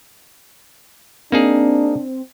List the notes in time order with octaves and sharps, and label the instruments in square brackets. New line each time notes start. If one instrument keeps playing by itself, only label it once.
[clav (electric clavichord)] A#3 D#4 G#4 [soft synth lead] C4 [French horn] D4